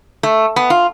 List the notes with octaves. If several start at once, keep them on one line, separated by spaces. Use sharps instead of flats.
A3
B3
F4